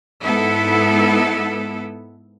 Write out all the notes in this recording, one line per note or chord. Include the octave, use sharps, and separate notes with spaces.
G#2 B3 E4 A4